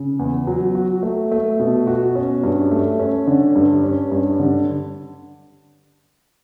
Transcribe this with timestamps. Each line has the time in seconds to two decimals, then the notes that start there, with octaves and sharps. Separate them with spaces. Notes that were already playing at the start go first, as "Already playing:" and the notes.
Already playing: C#3
0.19 E2
0.47 F#3
0.75 F#4
1.03 A3
1.32 A3
1.60 B2
1.87 F#4
2.15 C#4
2.43 G2
2.72 A3
2.99 C#4
3.27 D3
3.56 G2
3.83 C#4
4.12 G2
4.40 D3